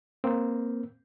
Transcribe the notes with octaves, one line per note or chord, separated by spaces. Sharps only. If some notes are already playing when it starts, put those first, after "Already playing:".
A#3 C4